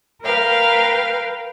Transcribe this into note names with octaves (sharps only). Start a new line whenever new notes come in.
A#4 B4 F5 G5